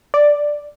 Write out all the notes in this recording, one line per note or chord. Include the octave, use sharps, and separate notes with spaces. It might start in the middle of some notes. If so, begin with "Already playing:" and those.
D5